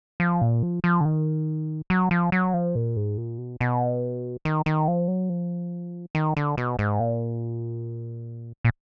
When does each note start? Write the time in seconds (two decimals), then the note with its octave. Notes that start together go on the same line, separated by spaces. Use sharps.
0.20 F3
0.42 A#2
0.63 F3
0.84 F3
1.01 D3
1.05 D#3
1.90 F#3
2.11 F3
2.32 F#3
2.54 F3
2.75 A#2
2.96 G#2
3.17 A#2
3.38 B2
3.60 B2
4.45 D#3
4.66 D#3
4.88 F3
5.08 F#3
5.29 F3
6.15 D#3
6.37 D3
6.57 B2
6.79 G#2
7.00 A#2
8.65 A#2